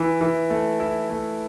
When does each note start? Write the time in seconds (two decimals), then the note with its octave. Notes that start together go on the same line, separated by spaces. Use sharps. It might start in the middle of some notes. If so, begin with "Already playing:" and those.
Already playing: E3 E4
0.21 E3
0.50 A3
0.80 E4
1.10 A3